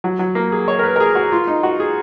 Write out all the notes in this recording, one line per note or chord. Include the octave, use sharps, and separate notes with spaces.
F#3
F#3
A#3
G#4
C#5
A#4
B4
A#4
G#4
F#4
F4
D#4
F#4
G#4